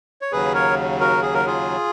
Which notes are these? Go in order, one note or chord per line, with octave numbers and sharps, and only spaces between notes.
C#5
D#2 C#3 F#3 G#4 B4
A#4 C#5
F#4 A#4
G#4
A#4
F4 G#4